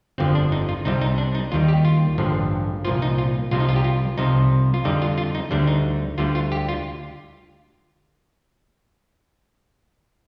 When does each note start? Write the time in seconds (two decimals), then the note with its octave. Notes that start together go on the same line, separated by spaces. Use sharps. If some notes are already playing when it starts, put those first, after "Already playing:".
0.18 G1 F2 D3 F3 C4
0.35 D4
0.52 D#4
0.69 F4
0.85 C2 C3 G3 D#4
1.01 D#4
1.18 D4
1.35 D#4
1.52 D#2 D#3 G3 F4
1.68 G4
1.85 F4
2.18 A1 G2 D3 F3
2.85 C2 A#2 F3 F4
3.02 D#4
3.18 F4
3.51 C2 C3 F3 F4
3.60 D#4
3.69 F4
3.76 G4
3.84 F4
4.18 C2 C3 F3 D#4
4.74 F4
4.84 F2 D3 G3 D#4
5.02 F4
5.18 F4
5.35 D#4
5.51 D2 D3 G3 D4
5.67 D#4
6.18 D2 D3 G3 F4
6.35 F4
6.52 G4
6.68 F4